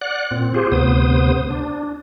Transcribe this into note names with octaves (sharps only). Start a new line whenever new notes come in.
D5 F#5 F#6
A#2 C4
F4 G4 G#4 C5
D2 C3 B3 C5 D#6
D4